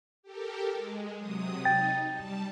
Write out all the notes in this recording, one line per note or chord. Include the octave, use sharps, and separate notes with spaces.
G4 A4 A#4
G#3
C3 F#3 D#6
D#4 G5 A6
G3 A5